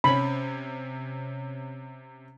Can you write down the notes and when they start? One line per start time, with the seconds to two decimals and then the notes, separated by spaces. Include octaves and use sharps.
0.04 C3 C#4 B5